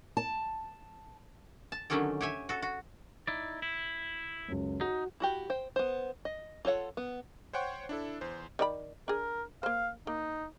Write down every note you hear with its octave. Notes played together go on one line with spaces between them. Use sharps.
A5
A5
D3 D#3 F#3 C#4 G4 A4
G4 C#5 E5 G#5
F#4 A4
F#4
D#4 E4 D5
E4
C#2 F#2
D#4 F#4
E4 F#4 G4
C5 G5
B3 C5
D#5
F4 A4 C#5 F#5
B3
C5 C#5 F#5 G5 C6 C#6
D4 E4 A4
E2 C5
D#3 D5 B5
D4 G#4 A#4
A#3 C5 F5
A#3 D#4